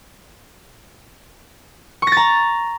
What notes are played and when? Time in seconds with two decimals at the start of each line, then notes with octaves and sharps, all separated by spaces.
2.02 C#6
2.07 A#6
2.12 A6
2.17 A#5